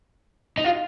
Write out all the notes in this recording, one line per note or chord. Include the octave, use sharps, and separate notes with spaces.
D#4
F4